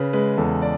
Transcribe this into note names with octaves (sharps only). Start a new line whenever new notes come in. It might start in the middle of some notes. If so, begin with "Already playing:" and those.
Already playing: C#3 B4
G#3 B4
E2 A4
D5